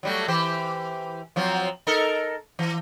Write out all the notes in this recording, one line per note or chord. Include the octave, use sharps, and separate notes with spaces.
F#3 G3 A3
E3 G4 C5
F3 F#3 C4
D#4 A4 A#4
E3